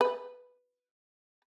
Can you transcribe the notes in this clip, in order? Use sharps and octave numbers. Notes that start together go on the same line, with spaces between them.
B4